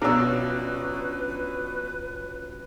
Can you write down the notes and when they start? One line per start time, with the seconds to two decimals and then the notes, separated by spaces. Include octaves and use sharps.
0.02 B2 F3 F#3 C#4 D4 B4 A#5 E6